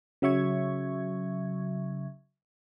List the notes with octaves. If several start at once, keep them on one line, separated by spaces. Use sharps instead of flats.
C#3 F#3 E5 C#6 G#6